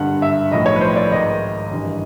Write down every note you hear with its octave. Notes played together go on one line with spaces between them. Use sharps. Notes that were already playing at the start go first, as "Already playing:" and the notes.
Already playing: G#1 G2 D3 F#5
E5
B1 A2 F3 D#5
C#5
B4
C5
D5
G#1 G#2 D#3 D#5
G#1 G2 E3